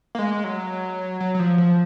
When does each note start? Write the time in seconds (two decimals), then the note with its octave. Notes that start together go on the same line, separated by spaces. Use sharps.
0.15 A#3
0.19 G#3
0.44 F#3
1.20 F#3
1.34 F#3
1.39 F3
1.58 F3